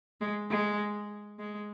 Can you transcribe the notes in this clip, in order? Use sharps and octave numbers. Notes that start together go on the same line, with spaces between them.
G#3
G#3
G#3